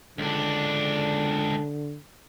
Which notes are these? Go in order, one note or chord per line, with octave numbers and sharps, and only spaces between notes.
C#2 D3 D4